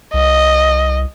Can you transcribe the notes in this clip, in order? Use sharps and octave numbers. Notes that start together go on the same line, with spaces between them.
C2 D#5